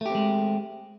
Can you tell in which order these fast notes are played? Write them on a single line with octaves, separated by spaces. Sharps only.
A3 G4 C4 G#3